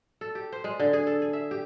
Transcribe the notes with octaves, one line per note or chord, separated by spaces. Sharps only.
A4
G4
C5
G#3
D3
G#4
A4
G#4
E5
G4